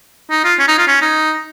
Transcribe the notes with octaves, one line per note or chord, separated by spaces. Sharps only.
D#4
F4
C#4
D#4
F4
C#4
D#4